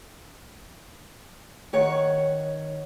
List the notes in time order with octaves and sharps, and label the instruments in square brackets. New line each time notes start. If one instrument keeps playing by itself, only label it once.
[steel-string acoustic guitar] D#3 C#5 F#5